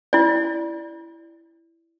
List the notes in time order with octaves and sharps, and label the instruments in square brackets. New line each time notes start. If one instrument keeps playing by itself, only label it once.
[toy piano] E4 D5